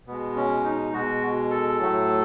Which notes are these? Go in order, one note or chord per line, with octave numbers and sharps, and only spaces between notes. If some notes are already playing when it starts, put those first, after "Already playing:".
B2 G#3 B3
C#4
D#4
B2 G#3 F#4
A4
A2 F#3 A3